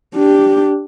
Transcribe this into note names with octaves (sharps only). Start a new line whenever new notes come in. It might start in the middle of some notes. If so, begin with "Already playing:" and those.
D4 G4